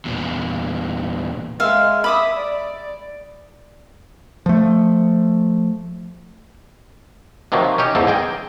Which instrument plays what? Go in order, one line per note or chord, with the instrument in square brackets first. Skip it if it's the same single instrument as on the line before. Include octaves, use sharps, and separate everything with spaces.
[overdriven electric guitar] E2 A#2
[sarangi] G#3 [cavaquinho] E5 F5
[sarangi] E5 [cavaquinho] B5 D6 D#6
[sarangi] D5
[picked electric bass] F3 A3
[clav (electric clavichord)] C3 D#3 F3 F#3 A#3
C#4 D#4 G4
E2 G#2 A#3 A4
G#4 D#5 G5